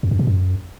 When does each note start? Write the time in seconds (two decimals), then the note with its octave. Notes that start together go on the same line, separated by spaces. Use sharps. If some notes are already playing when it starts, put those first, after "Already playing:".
0.03 F2
0.11 F#2
0.19 B2
0.27 F#2